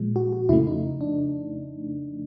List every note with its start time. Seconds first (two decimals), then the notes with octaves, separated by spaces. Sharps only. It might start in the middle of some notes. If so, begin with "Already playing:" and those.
Already playing: A#2 F3 G#3
0.16 F#4
0.33 F#4
0.49 F2 C#3 F3 A3 E4
0.67 D#4
1.01 D4